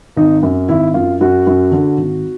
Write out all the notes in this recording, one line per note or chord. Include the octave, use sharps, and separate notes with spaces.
G#1 D#4
F#2
G#1 E4
F#2 F4
F#2 F#4
F#2
D3
G#1